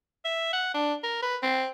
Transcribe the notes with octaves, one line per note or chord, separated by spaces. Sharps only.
E5
F#5
D4
A#4
B4
C4